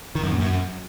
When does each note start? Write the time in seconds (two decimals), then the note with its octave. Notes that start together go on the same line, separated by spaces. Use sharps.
0.15 D#3
0.23 F#2
0.31 A#2
0.40 F#2